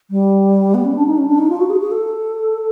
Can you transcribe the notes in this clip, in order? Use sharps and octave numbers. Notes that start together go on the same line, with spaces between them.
G3
B3
C#4
D4
D#4
C#4
D4
D#4
F4
F#4
G#4
G#4
A4